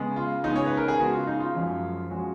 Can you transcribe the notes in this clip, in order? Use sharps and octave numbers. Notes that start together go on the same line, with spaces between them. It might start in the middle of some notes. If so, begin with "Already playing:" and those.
Already playing: C#3 G#3 B3
F4
C#3 G#3 B3 D#4
C#5
B4
A#4
G#4
C#3 G#3 B3 F#4
F4
D#4
F4
F#2 F3 G#3 C#4
F3 G#3 C#4 F#4